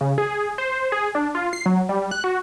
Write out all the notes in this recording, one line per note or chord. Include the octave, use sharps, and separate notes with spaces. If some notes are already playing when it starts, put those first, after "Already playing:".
C#3
G#4
C5
G#4
D4
F4
C7
F#3
G3
F#6
F#4